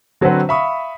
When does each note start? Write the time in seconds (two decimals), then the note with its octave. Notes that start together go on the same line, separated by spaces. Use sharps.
0.21 D3 F#3 C4 F#4 B4 C5
0.49 E5 F5 B5 C#6 D#6